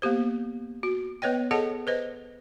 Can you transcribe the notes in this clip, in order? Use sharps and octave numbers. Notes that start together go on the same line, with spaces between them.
A#3 B3 G4 C5
F#4
B3 B4 C#5 D#5 G5
G#4 A4 C#5 D#5 F#5 A5
B4 C5 D#5